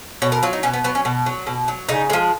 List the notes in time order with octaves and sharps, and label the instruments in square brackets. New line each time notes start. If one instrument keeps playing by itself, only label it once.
[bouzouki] B2 C#5
A#4
F#3 F4
D#4
B2 C#4
B3
F#3 B3
C#4
B2
F#3
B2
F#3
C#3 D#4
F3 G#3